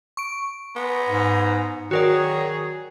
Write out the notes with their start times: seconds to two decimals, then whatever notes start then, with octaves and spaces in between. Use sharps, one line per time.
0.17 C#6 D7
0.76 B3 G#5 A#5 C6
1.09 G#2
1.91 D#3 F#3 F#4 G#4 A#4 D5